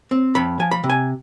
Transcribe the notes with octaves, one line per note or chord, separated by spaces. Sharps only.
C4
F2 B5
F3 G#5
B5
C3
G#5